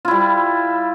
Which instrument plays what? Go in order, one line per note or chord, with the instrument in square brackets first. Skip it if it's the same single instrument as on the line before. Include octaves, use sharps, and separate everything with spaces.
[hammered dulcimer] F4
E4
G3